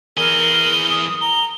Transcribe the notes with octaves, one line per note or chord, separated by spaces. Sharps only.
E3 G#4 A#4 G7
D#6
A#5 G7